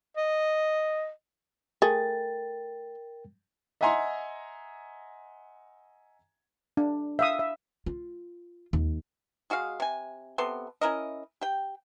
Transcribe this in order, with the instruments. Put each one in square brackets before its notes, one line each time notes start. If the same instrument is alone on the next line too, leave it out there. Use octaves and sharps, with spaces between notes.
[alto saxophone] D#5
[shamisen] A3 G#4 [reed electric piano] A#4 G5 A6
[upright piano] D#5 E5 F#5 G#5 A#5 C6
[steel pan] D4
E5 F5 D#6
E5
[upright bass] F4
D#2
[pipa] G#3 F#4 G#4 F5
C3 G#5
C3 B3 A4 C6
C#4 E4 A#4 D#5
G4 G5